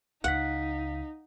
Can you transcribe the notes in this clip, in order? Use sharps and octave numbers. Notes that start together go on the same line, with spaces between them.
C#2 C#3 D#4 F5 F#5 B6